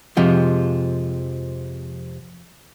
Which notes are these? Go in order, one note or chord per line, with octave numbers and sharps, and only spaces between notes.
F2 C3 F3 G#3